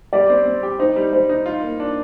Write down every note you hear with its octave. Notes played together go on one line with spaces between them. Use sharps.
G3 D5
C4
C4
G4
D#4 C5
G3
G3 C5
D#4
F4
A#3
D4